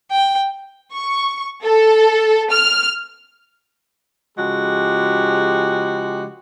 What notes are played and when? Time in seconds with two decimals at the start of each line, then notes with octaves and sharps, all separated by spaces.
0.11 G5
0.94 C#6
1.63 A4
2.52 F6
4.38 C#3 F3 G#3 F#4 G4